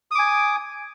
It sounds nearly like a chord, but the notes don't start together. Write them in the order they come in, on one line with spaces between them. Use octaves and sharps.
D#6 D6 G#5